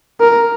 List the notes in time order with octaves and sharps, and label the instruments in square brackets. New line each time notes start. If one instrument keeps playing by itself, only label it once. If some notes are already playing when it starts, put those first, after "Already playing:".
[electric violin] A#4